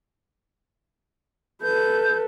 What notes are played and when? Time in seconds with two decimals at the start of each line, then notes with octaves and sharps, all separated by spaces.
1.63 A4 B4 G6